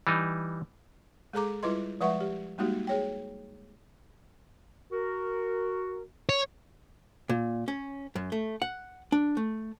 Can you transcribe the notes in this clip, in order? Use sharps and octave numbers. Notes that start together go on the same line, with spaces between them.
E3 G3 D#4
G#3 G#4 A4 A#5 D6
G3 E4 F4 B4 D#5 C6
F3 G#3 B4 E5 F#5 C#6
G4
G3 G#3 A#3 D#4 F#4 G4
G#4 C#5 G5
F#4 A#4
C#5
A#2
C#4
F#2
A3
F#5
D4
A3